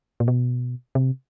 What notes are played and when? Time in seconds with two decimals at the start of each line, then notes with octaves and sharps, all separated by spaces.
0.20 A#2
0.28 B2
0.95 C3